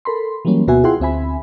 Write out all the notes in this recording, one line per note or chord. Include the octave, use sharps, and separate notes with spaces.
A4 A#4 B5 C6
E3 F#3 G3 A#3 C#4
D2 B2 B3 F#4 E5 G#5
E4 F4 G#4 F#5 G5 C6
D2 C4 E5 G#5 B5